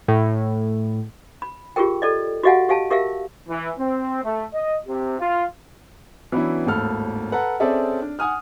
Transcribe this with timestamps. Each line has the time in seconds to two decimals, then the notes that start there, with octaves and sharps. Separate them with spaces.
0.08 A2
1.42 B5
1.76 F4 G4 G#4 A#4 G5
2.02 A4 D5 D#5
2.43 F#4 G4 D#5 F5 F#5 G#5
2.69 G4 F5 G#5 A5
2.90 G4 A#4 E5 F5
3.49 E3
3.78 C4
4.24 A3
4.54 D#5
4.86 C3
5.19 F4
6.32 E3 F#3 B3 C#4 D4 E4
6.66 G#1 D#2 A2 A4 F6
7.32 A4 B4 F#5 A#5
7.60 C4 C#4 G#4 A4 D5 E5
8.02 D4
8.19 F#5 G#5 D#6 F6